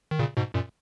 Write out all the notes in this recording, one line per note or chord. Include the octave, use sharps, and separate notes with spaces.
D#3
A#2 C#3
G#2 B2
F#2 A#2